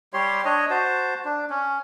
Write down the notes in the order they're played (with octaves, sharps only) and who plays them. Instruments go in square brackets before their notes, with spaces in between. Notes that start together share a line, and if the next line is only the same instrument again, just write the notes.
[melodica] G3 G4 C#5 C6
D4 C#5 D#5
F#4 C5 A5
D4
C#4